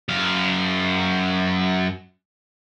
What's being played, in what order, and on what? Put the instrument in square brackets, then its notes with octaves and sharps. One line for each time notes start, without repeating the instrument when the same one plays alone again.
[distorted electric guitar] F#2 F5